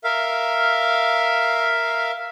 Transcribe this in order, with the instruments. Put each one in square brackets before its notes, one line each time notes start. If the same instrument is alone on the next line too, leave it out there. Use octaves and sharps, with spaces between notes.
[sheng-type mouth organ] A#4 E5 F5